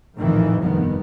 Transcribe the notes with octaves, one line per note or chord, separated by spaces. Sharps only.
A#1 F2 A2 D#3 E3
F1 G2 D#3 B3